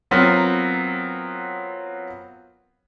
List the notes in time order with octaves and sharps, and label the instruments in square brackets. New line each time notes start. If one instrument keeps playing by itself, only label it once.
[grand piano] F#3 B3 C4 F4 A#4